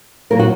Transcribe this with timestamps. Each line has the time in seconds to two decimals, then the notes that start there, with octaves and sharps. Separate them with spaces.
0.30 A#2 F#3 A#3 A#4
0.39 F#4